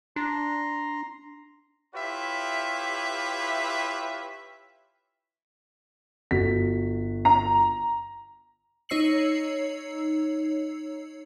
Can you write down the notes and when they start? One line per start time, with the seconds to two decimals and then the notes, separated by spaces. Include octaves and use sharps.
0.16 D4 A#5 C6
1.95 E4 F4 G4 B4 C#5 E5
6.31 G1 F#4 B6
7.25 A#5
8.89 D#4 C#5 E6 C7 C#7 F#7